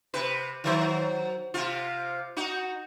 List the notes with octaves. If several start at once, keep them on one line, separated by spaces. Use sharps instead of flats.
C3 B4
D#3 F#3 C5
C3 F4
D#4 F#4